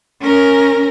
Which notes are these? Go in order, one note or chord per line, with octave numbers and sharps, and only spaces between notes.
C#4 A#4